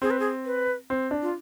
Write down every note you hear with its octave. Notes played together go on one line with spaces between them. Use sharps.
C4 G#4
B4
G#4
B4
C4
D4
F4